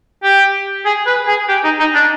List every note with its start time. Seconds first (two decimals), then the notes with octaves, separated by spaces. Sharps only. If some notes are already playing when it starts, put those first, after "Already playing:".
0.23 G4
0.85 G#4
1.06 B4
1.27 G#4
1.48 G4
1.64 D#4
1.79 D#4
1.94 D4